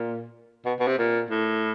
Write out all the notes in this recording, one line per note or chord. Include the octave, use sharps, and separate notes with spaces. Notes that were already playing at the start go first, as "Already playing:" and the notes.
Already playing: A#2
B2
B2
C3
A#2
A2